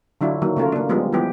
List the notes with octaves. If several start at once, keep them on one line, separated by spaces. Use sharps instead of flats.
D3 F#3 D4 E4 F4
D#3 F#3 A#3
C#3 A3 F4 A#4
A#3 D4
F3 G3 G#3 B3
E3 F3 G3 B3 G4